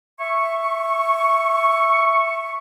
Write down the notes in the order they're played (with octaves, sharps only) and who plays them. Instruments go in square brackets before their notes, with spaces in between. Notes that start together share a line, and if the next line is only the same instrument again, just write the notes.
[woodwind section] E5 C#6